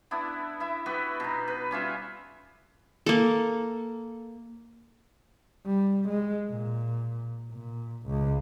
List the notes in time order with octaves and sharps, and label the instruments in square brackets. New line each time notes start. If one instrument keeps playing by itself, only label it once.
[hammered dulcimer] B3 D4 E4
E4 E5
B3 F#4 G4 B4
B2 D#4
B4
G3 C#4 F4 E5
[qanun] A#3 A4
[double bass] G3
G#3
A#2
A#2
C#2